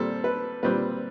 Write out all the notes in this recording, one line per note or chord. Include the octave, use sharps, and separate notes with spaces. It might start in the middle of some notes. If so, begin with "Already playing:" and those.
Already playing: A#2 G3 C4 A4
B4
A#2 G3 C4 B4